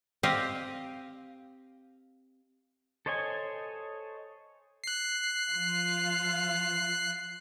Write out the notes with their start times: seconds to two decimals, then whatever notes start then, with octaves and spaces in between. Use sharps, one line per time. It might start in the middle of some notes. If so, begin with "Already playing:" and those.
0.23 C4 G4 D#5 F5
3.06 A4 C5 C#5 D#5 G#5
4.84 F#6 C7
5.49 F3 F4 F5